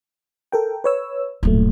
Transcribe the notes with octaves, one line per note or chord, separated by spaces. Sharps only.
A4 A#4 G5
B4 C#5 E6
D1 G2 A#2 F#3 A3